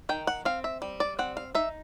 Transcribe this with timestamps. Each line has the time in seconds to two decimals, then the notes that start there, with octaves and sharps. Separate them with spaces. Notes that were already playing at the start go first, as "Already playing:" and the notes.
0.09 D#3 G5
0.27 F#5
0.45 C4 F5
0.64 E5
0.82 G3
1.00 D5
1.19 C4 F#5
1.37 F5
1.55 D#4 E5